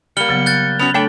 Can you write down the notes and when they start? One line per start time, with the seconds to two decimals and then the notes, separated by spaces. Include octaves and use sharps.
0.17 G3 A#3 F6 C#7 G7
0.29 C#3 F#3 B3
0.46 F#6 G6 A6
0.79 B3 C#4 F#4 F7
0.94 A3 D4 A4 C#5 G5 B5